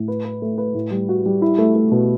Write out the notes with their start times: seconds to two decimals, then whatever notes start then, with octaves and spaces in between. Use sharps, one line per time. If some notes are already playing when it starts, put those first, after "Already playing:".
Already playing: A2
0.08 B4
0.25 B4
0.42 A3
0.58 B4
0.74 A2
0.91 G3
1.09 F#4
1.26 G3
1.42 E4
1.58 A3
1.75 A3
1.91 B2